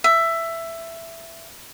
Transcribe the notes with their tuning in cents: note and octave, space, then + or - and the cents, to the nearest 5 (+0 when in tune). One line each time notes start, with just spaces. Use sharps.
E5 +10